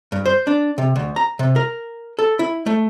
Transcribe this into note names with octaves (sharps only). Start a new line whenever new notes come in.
G2
C5
D4
C3
D2
A#5
C3
A#4
A4
E4
A3